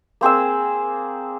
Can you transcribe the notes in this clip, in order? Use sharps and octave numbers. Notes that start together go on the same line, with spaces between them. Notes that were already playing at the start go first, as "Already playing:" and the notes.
A#3 C4 G#4 E6